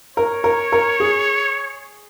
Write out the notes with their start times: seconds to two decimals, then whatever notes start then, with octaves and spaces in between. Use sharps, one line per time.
0.17 A#4 C#5
0.44 A#4
0.72 A#4
1.00 G#4